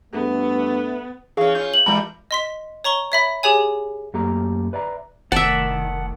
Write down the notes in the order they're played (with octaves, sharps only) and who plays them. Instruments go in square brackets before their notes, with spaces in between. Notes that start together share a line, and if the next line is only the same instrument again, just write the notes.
[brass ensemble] G2 A3 [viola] B3
[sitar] E3 C#4 [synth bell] G#4 F5 C#6
[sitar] C#4 F4 [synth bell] G6
[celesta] F#7
[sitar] A#2 E3 G3 [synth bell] G#3 A#5 B5
[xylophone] D#5 C6 B6
C#5 A#5 C#6 G7
C#5 E5 B5
G4 G#4 C#5 G#5
[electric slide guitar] F#2 A3 A#3 G4 A4 A#5
B4 D5 E5 A#5
[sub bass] F1 [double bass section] C2 D#3 A3 [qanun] D5 E5 [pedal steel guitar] F#5 A5